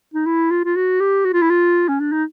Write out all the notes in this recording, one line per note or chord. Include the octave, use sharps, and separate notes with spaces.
D#4
E4
F4
F4
F#4
G4
F#4
F4
E4
F4
C#4
D4
D#4